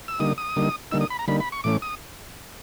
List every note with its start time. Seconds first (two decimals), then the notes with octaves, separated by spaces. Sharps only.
0.08 E6
0.20 D3 G3 A#3 D#4 D#6
0.38 D#6
0.56 D3 G3 A#3 D#4
0.91 D3 G3 A#3 D#4 E6
1.01 D#6
1.10 B5
1.19 A#5
1.28 D3 G3 A#3 D#4 B5
1.40 B5
1.52 C#6
1.64 A2 E3 A3 C#4 D6
1.82 D#6